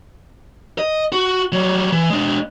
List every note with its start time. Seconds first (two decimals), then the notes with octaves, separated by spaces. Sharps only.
0.79 D#5
1.12 F#4
1.52 F#3 G3
1.92 E3
2.10 G#3 D4